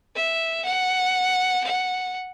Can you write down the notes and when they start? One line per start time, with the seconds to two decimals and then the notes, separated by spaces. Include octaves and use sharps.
0.16 E5
0.65 F#5
1.64 F#5